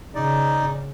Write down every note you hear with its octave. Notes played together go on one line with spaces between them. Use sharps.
C#3 D#4 D5